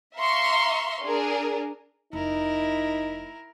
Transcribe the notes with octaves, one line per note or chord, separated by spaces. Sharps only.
E5 F5 A#5 C6 C#6
D4 G#4 A#4
F1 D#4 E4 A#4